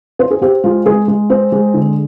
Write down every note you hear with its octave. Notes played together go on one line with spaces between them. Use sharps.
C4 C5
G#4
C4 G4
G#3 F4
G#3 G#4
G#3
C4
G#3
D3